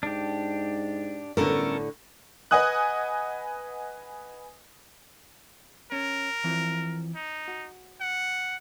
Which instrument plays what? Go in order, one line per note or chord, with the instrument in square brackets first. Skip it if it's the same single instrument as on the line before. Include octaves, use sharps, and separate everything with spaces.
[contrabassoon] G#2 [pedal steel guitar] D4 G4
[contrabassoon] G1 [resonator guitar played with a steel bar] A2 D3 [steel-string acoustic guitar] C#4 A4 A#4
[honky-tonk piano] B4 D#5 F#5 G#5 D#6 F#6
[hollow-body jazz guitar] C#4 [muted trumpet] A#4
[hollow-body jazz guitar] E3 F3 C4
[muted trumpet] D#4
[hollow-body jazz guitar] F#4
[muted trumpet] F#5